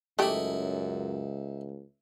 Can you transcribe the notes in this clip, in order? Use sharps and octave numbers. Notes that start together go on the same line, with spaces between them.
C#2 F#2 E3 A3 D#4 E4 G4